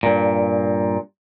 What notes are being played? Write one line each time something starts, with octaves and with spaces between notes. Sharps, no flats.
G2 A#2